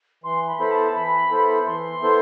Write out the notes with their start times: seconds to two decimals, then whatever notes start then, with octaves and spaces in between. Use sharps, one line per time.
0.24 E3 C6
0.47 B5
0.59 B3 E4 A4 C5 B5
0.71 A5
0.95 E3 B5
1.31 B3 E4 A4 C5
1.66 E3 C6
2.02 B3 E4 A4 C5